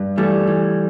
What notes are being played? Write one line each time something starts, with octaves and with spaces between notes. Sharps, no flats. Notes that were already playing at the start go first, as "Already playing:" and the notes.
Already playing: G2
E3 G3 A3
E3